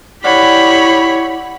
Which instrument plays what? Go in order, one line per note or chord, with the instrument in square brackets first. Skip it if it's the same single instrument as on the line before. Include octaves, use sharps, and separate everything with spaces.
[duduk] E4 [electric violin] G4 B5 [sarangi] C#5 [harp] D5 F5 F#5